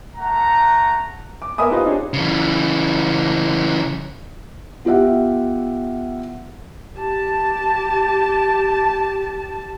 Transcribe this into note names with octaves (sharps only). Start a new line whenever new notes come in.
A3 F#5 A#5
D6
B3 A#4 E5 G#5 B5 D#6
D#4 F4 G4 B4 C5 D#5
D4 D#4 G4 G#4 C#5
C#3 E3
B3 F4 G4 E5 F#5
G4 A5